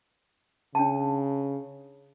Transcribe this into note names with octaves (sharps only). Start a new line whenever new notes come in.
C#3 D4 G5 A5